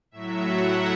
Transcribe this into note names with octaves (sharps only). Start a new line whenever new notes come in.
A2 F#3 E5
F#5